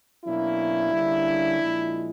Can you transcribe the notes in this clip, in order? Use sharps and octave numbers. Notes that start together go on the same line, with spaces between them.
B2 F#3 A#3 C#4 D4 E4
D3 G3 A#3 C#4
A#2 F3 G#3